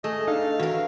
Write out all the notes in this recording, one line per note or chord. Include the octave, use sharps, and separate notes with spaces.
A3 G#4 D#5
D4 D#4 A4 F5
E3 F#4 A#4